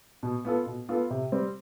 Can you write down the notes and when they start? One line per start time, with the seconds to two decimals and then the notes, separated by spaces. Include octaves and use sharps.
0.23 B2
0.45 B3 F4 A4
0.66 B2
0.89 B3 F4 A4
1.11 C3
1.32 G3 C4